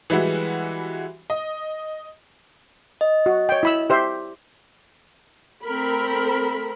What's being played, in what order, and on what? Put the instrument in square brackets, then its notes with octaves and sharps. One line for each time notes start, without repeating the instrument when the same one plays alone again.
[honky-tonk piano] E3 G3 G#3 E4 F#4
D#5
[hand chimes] D#5
[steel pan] F#4
C#5 G5
E4 B5 E6
G4 C5 E5
[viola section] A3 C4 A4 A#4 B5